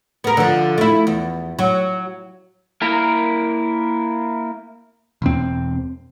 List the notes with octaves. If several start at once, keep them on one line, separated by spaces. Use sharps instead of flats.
B3 A#4
D3 F3
A3 E4
E2
F#3
A#3 E4 A#4
E1 C4